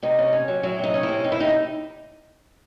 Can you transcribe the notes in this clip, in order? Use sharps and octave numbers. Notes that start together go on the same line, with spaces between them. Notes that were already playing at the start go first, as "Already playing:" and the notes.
C3 D#4
C#4
C#4
F#3
F#3 E4
C3 D#4
C#4
E4
C3
C3 D#4
E4
C3 D#4